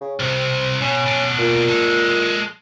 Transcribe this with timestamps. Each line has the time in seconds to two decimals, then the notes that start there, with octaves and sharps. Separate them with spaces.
0.01 C#3
0.20 C2 C3 C4
0.81 B2 C#4
1.07 B2 D4
1.39 A#2
1.69 G#3 A4